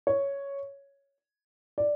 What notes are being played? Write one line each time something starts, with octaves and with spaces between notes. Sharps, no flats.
C#5
D5